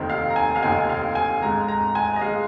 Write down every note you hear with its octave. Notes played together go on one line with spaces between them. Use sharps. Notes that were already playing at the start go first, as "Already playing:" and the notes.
Already playing: F1 D#2 D#3 C4 D#4
F5
A#5
G#5
F5
F1 D#2 D#3 C4 D#4 G#5
F5
G#5
G#1 G#2 G#3 A#5
A#5
G#5
D#5
G#2 G#3 F5